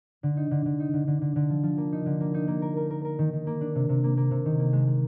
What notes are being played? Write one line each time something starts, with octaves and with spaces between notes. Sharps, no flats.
D3
D#4
D3
D3
D#4
D3
D3
D3
D3
F3
F3
A#3
D#4
D3
A#3
D#4
A#3
A#4
A#4
A#4
A#4
D#3
D#3
A#3
D4
C3
C3
A#3
A#3
C3
D#3
A#3
G#3
G#3